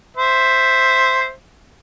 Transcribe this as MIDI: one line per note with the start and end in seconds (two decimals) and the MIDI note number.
0.17 1.31 72
0.17 1.31 76